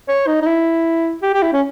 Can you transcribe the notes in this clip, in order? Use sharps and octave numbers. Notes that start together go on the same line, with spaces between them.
C#5
D#4
D#4
E4
G4
G4
E4
C#4